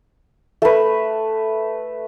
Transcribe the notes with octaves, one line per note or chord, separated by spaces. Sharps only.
A3 B4